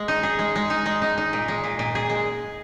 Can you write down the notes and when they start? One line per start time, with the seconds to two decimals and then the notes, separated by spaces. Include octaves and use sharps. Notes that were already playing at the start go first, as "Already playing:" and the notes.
Already playing: G#3
0.08 D#4
0.23 G#4
0.39 G#3
0.56 G#3
0.70 D#4
0.86 G#3
1.02 D#4
1.18 D#4
1.33 A#2
1.48 G#3
1.64 A#2
1.79 A#2
1.95 G#4
2.10 G#3